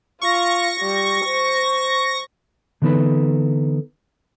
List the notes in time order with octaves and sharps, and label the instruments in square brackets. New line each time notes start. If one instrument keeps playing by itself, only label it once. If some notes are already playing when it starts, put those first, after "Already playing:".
[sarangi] F4 [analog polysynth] C#6 A#6
[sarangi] G3
C5
[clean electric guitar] D3 E3 B3 D#4 A4 B4